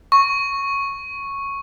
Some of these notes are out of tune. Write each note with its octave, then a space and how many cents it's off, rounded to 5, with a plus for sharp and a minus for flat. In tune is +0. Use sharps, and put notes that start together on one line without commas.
C#6 -5